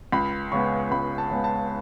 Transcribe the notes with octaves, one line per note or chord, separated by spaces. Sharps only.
C#2 B5
C#3 G#3 B3 C#6
C#2 B5
A5
C#3 G#3 B3
A5